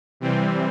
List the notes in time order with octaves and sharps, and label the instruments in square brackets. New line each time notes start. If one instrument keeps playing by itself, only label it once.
[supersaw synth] C3 E3 G3 C4